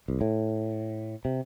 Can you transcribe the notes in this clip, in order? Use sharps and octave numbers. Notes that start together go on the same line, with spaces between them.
C2
A2
C3